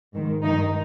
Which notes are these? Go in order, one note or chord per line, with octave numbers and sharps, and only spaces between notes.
G#2 D#3
G2 D#3 D#4